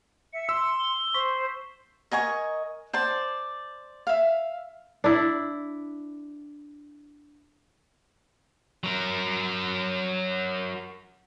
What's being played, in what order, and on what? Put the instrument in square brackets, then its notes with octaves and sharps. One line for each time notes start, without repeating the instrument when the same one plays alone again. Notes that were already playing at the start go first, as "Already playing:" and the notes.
[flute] E5 [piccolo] C#7
[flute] C6 [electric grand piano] E6
[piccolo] G7
[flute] C5 [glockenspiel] C6 C#6 B6
[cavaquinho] A#4 D#5 G#5 C#6
C5 D5 A5
E5 F5
[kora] D4 E4
[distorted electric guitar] F#3 A#4